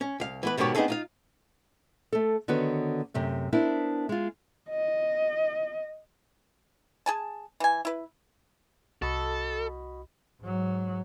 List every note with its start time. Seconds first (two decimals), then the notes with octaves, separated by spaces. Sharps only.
0.01 C#4
0.20 C2 F5
0.43 E3 B3 B4
0.57 G#2 B2 D#3 B3 G4 C#5
0.75 B3 C4 D4 D#4 G#4 A4
0.88 D#4 F4 F5
2.12 A3 A4
2.48 D3 D#3 B3 F#4 B4 C#5
3.14 F#2 C3 A3
3.53 B3 D4 E4 A#4 C5
4.09 G#3 F4
4.70 D#5
7.06 G#4 G#5 A5
7.60 E3 G#5
7.85 E4 B4
9.02 C2 F#4 A4 D#5 B5
10.41 G#2 F#3